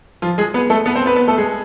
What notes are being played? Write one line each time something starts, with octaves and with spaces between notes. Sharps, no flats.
F3 F4
G#3 G#4
B3 B4
A3 A4
B3 B4
C4 C5
B3 B4
B3 B4
A3 A4
G#3 G#4